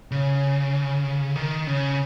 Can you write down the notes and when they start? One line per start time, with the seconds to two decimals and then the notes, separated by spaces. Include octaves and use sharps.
0.11 C#3
1.36 D#3
1.67 C#3